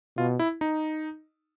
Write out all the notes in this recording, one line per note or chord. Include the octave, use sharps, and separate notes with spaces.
B2 F4
E4
D#4